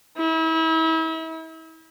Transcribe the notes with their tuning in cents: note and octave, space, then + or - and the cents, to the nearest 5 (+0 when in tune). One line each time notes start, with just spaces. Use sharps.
E4 -35